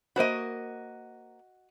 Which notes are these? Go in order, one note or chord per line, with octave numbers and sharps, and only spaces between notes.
A#3 F#4 C5 D#5 B5